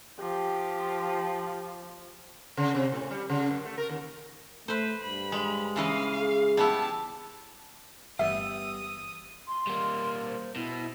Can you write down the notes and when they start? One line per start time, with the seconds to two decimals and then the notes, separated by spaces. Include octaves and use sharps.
0.20 F3 G4
2.57 C#3
2.75 C3
2.92 A2
3.11 G3
3.30 C#3
3.51 F#2
3.65 A3
3.78 A#4
3.89 D#2
4.68 A3 B4 C5
5.02 G2 B5
5.32 G#3
5.76 C#3 E3 D#5 F5
6.21 G#4
6.57 G3 B3 E4 A5
8.19 G1 E3 G3 B3 E5 D#6 E6
9.48 C6
9.67 G3 A#3
10.26 C5
10.56 B2 E4